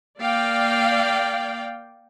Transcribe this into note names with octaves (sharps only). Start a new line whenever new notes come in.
A#3 D5 F5 G5